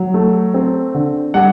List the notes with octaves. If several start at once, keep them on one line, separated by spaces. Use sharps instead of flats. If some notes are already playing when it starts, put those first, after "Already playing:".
Already playing: F#3
A3
C4
D3
G3 F#5